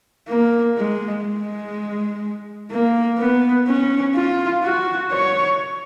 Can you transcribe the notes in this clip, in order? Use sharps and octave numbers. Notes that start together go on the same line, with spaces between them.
A#3
G#3
G#3
A#3
B3
C#4
F4
F#4
C#5